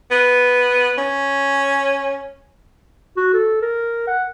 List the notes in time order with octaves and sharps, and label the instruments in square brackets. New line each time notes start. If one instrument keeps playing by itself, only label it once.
[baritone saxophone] B3
C#4
[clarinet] F#4
A4
A#4
F#5